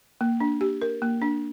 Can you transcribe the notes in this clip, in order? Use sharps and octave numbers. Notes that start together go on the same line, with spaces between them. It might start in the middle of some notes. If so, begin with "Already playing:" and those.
A#3
D4
G4
A#4
A#3
D4